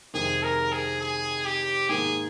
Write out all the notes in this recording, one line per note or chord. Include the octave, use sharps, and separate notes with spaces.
F2 C3 D#3 G#3 G#4
A#4
G#4
G#4
G4
G#2 D#3 A#3 G#4